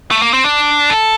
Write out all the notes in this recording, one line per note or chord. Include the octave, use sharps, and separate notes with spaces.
A3
A#3
C4
D4
A4